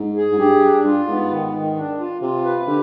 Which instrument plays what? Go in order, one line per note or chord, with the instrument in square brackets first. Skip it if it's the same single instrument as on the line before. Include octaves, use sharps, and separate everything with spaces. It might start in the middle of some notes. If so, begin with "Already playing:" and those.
Already playing: [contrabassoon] G#2
[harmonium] G#4
[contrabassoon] G#2
[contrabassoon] G2 [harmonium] G4
[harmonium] D4
[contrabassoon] G2 [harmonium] F4
[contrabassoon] G#2 [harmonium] B3
[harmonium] D#3
D#3
D4
F4
[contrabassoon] C3 [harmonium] F4
[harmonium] B4
[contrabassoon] D3 [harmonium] G4